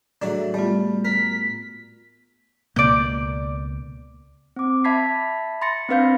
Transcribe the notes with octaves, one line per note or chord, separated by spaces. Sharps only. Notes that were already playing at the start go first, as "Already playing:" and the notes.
A2 F#3 A3 D4 F#4 G#4
G3 A3 B3 F4
A#4 B6
C#2 B2 A#3 D5 G6
C4 D6
E5 A5 B5 G#6 B6 C7
B5 C6 A6 A#6 C#7
C4 D4 B4 F5 G6